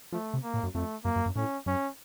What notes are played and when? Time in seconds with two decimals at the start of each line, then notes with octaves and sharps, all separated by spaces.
0.12 F3 A3
0.34 C3
0.43 A#3
0.54 A2
0.63 F#2
0.75 F2 A3
1.04 F#2 A#3
1.16 F#2
1.26 F#2
1.36 A2 C#4
1.66 F#2 C#4